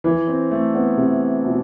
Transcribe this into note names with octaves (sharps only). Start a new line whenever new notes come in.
E3
C4
A3
B3
C3
B2